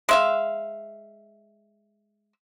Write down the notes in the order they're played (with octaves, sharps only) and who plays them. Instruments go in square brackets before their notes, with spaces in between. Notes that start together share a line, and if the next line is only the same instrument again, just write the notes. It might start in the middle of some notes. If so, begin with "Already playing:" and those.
[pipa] G#3 E5 F5